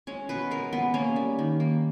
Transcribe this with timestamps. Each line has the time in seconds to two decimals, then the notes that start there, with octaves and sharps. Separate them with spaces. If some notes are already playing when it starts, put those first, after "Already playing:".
0.07 G#3 C#4
0.29 B2 B4
0.51 G#3 A#4
0.73 G#3 B3
0.94 A#3 C#4
1.16 G3
1.39 D#3
1.60 A#3